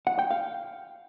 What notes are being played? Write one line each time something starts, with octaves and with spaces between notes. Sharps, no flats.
F#5
G5
F5